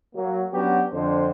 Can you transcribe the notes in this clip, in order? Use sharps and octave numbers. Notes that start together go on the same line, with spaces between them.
F#3 A#3
F#3 B3 C#4 D4 F#4 G4
F2 D3 D4 C5